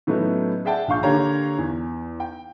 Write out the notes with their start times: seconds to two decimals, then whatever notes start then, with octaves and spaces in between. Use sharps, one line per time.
0.07 A2 F#3 A3 B3 C#4 D#4
0.65 G#4 D5 E5 F#5 G5 A5
0.88 A#1 D4 F5 C#6 G6
1.03 D3 A#3 G4 C#5 F5 A#5
1.58 E2
2.20 G5